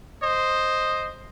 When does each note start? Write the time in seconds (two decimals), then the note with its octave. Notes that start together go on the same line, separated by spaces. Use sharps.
0.22 C5 D#5